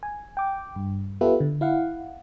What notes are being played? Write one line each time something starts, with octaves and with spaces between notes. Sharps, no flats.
G#5
G5 D6
G2
B3 F4 G4 A4 B4 E5
D3
E4 F5 F#5